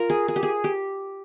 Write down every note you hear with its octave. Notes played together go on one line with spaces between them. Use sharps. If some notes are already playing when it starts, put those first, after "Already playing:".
Already playing: F4 A#4
G#4
G#4
G4
G#4
G4